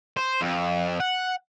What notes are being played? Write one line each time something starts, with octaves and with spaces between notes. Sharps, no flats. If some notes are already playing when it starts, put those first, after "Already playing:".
C5
F2
F#5